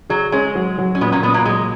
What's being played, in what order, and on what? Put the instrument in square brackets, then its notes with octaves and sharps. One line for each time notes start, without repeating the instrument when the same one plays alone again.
[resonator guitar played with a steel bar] F#3 [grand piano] G#4
[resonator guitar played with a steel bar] G#3 [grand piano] C#4
[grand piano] F#3
F#3
[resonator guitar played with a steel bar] C#4
[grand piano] A#2 [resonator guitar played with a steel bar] G#3 B3
[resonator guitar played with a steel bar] A#3 C#4
[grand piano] A#2 [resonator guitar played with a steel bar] G#3 B3
[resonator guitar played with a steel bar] F#3 A#3
[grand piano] F#3 [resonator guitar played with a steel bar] G#3